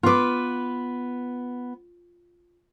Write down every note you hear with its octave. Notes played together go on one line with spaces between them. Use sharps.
B3 F4 B4 D6